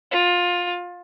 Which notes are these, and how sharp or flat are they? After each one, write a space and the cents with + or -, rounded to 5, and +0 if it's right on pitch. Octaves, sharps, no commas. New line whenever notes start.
F4 +20